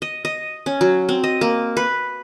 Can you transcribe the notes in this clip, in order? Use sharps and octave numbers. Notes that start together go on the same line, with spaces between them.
D#5
D#5
C#4
F#3
C4
D#5
A#3
B4